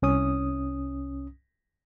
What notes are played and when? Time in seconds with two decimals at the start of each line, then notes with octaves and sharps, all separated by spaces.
0.02 C2 C#4 D#6